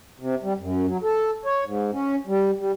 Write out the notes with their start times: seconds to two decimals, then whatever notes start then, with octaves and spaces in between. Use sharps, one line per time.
0.20 C3
0.43 G3
0.59 F#2
0.86 F#3
1.03 A4
1.45 C#5
1.64 G#2
1.93 C#4
2.27 G3
2.59 G3